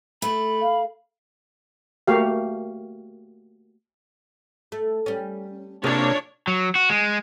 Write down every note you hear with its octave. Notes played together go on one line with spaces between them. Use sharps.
A3 B5
F5
A3 A#3 F#4 G4 F5
A3
G3 C#4
C3 A#3 D4 F4 G#4 C#5
F#3
F#4
G#3